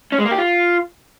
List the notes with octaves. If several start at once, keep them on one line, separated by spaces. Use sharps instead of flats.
C#4
G#3
A#3
G4
F4